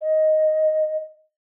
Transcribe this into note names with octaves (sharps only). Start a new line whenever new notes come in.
D#5